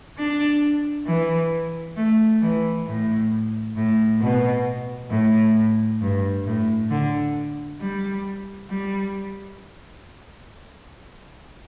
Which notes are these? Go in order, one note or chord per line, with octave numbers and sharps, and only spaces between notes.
D4
E3
A3
E3
A2
A2
B2
A2
G2
A2
D3
G3
G3